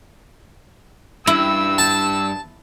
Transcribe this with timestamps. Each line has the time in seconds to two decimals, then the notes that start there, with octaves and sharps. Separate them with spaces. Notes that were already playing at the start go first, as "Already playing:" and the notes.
1.27 G2 E4 E6
1.78 A5